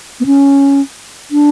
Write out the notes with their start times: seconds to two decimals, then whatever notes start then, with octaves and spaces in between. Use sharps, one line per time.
0.20 B3
0.26 C#4
1.31 D4